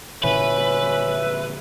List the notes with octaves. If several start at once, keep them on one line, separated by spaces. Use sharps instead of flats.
A#2 D3 E3 C#4 B4 E5